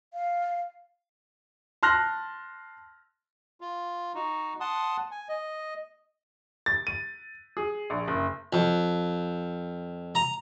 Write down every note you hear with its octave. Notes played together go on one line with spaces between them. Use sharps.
F5
A5 C6 F6 F#6 A#6
F4
D#4 F#4
F#5 A5 C6 D#6
G#5
D#5
A6
D#7
G#4
A#1
F#1
F2
A#5